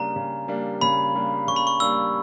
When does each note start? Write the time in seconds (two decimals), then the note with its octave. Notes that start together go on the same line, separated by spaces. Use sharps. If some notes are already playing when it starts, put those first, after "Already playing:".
Already playing: C#3 G3 A#3 D4 A#5
0.16 C#3
0.48 G3 A#3 D4
0.81 C#3 B5
1.15 G3 A#3 D4
1.47 C#3 C#6
1.56 B5
1.67 C#6
1.80 G3 A#3 D4 E6